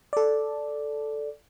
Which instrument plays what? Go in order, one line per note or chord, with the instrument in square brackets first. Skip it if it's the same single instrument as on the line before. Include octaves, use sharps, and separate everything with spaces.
[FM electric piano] A4 D5